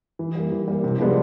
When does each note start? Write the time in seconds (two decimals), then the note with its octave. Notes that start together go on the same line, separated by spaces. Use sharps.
0.19 E3
0.35 G3 A#3
0.52 E3
0.68 G3 A#3
0.84 C3
1.00 F3 G#3 B3 D4